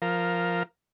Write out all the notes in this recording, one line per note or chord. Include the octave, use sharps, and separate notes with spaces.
F3 A#4